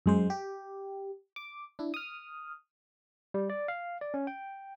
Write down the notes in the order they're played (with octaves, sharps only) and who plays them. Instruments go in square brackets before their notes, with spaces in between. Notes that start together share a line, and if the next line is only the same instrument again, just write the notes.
[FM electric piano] F#2 G#3 C5
G4
D6
D4 E4
D#6 F6
[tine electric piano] G3
D5
F5
D5
C#4
G5